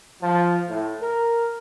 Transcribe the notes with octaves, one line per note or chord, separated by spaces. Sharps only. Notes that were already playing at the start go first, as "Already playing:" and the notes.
F3
A2
A#4